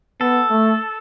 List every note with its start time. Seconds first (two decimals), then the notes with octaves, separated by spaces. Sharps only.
0.21 B3 A4
0.51 A3